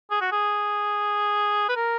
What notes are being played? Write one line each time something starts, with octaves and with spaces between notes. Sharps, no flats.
G#4
F#4
G#4
B4
A#4